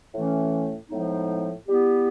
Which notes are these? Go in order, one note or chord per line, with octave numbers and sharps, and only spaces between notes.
A2 E3 A3 C#4
A2 F3 G#3 B3 D#4
G3 B3 E4 G4